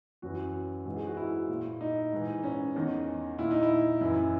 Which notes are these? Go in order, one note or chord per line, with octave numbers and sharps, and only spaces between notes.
F#2 E3 F#4
G#2 E3
G#4
F#4
E4
A#2
D#4
G#2 E3
C#4
E2 D#3
A#2 E4
D#4
E4
F#2 E3 E4